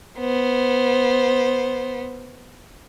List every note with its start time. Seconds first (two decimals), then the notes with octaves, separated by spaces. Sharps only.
0.19 B3 C5